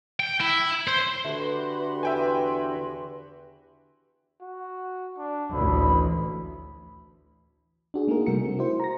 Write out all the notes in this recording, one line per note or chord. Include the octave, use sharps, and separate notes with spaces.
G5
E4
C5
D3 A3 F#4 G4 B4 C6
E2 E5 G5 G#5
F#4
D4
A1 D2 B5
D4 F#4 G#4
A3 A#3 D#4 G#4 A#4
C3 G3 A3 F#4 A#4 C#7
C4
E4 F#4 C5
A#5 A#6